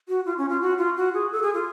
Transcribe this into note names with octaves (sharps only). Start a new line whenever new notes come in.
F#4
F4
C#4
F4
F#4
F4
F#4
G#4
A4
G#4
F4